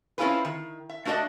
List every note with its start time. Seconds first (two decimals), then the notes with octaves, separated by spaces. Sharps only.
0.18 C4 C#4 E4 F4 G#4 B4
0.45 D#3
0.90 E5
1.05 A3 D4 F#4 B4 D5 D#5